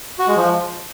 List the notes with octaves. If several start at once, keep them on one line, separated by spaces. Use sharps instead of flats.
F#4
G#3
F3